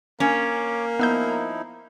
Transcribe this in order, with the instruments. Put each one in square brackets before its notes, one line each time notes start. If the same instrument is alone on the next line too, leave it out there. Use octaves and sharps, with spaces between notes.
[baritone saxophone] A#3 [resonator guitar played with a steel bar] C#4 [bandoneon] C#5 D6
[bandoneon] F3 D#4 E4 [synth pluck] B3 E6 G6